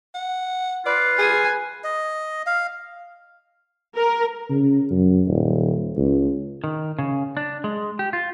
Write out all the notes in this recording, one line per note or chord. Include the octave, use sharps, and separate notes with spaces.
F#5
F4 B4 D5
G#4 G#5
D#5
F5
A#4
C#3
F#2
D#1
C#2
D#3
C#3
D4
G#3
G4
F4